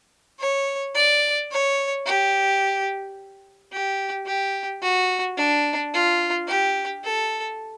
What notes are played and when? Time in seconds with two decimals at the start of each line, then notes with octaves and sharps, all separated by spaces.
0.40 C#5
0.95 D5
1.51 C#5
2.06 G4
3.72 G4
4.26 G4
4.82 F#4
5.37 D4
5.93 F4
6.47 G4
7.04 A4